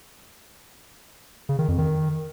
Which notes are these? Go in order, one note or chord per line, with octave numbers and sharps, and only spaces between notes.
C#3
D#3
F2
D#3